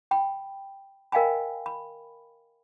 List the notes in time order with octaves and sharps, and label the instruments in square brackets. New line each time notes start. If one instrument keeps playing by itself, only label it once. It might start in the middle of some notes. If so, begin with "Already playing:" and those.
[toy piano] G5 B5
A#4 D#5 F5 G5 G#5 B5
B5